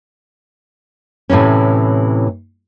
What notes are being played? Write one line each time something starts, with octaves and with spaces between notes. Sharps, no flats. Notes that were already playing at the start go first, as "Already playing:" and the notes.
A2 C3 E3 C#4